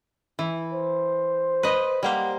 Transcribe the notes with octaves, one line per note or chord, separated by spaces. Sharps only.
E3
C5
B4 D#5
G3 A#3 C5 F#5